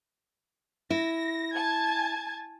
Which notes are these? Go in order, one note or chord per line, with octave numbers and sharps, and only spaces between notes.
E4 A#6
G#5 A5 G#6